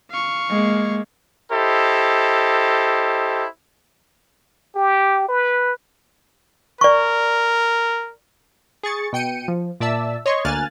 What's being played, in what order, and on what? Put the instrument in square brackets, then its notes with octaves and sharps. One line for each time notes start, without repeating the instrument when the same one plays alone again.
[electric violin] F5 C#6
[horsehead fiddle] G#3 A#3
[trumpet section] E4 G4 A4 C5 D#5
[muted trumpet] G4
B4
[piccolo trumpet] A#4 [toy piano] D5 C#6
[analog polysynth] G#4 C#6 A6 C#7
B2 G5 C#7 D#7
F3
A#2 D5 E5 A5 E6
C#5 D#5 C6 C#6
D2 A#3 G#5 F6 F#6 A6